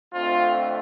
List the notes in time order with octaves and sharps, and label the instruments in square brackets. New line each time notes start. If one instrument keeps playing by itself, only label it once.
[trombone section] F2 D3 A3 C4 F4